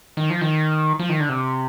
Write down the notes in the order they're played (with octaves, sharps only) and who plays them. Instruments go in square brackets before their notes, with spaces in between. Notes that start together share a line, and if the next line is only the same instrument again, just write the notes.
[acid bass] D#3
F3
D#3
F3
D#3
D3
C3